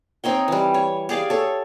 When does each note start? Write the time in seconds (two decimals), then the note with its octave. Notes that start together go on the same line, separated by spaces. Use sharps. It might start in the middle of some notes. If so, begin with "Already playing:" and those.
0.24 C4 D#4 C#5 G5
0.48 E3 G3
0.74 C#5
1.09 G4 G#4 D5 F5
1.30 A4 C#5